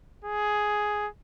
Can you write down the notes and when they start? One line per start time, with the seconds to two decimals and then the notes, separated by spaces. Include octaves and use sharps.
0.24 G#4